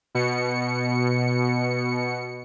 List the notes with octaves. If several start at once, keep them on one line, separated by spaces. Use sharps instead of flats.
B2 C#7